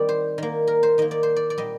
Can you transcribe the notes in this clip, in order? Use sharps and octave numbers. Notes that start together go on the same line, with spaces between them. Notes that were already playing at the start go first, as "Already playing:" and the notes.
Already playing: D#3 G3 C4 D5
C5
D#3 A#3
A#4
C5
D#3 A#3 D#5
D5
C5
D5
D5
A#2 G3 C4 D#5